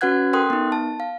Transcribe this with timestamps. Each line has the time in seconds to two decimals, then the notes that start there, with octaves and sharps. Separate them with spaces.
0.01 C#4 F#4 B4 F#5 F#6 G#6
0.33 A4 A#4 G5 C6 D#6 F#6
0.50 B3 D#4
0.72 A5
1.00 F5